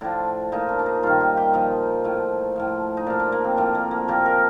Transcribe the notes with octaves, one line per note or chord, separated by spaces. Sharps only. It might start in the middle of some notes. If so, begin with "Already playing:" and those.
A2 F3 D4
A#2 F3 D#4
D4
D4
D#4
G2 D#3 F4
G4
G4
A#2 F3 D#4
A2 F3
A2 F3
D#4
A#2 F3 D4
D4
A#3
C4
A2 F3 D4
A#3
A#3
A#2 F3 G4
A#4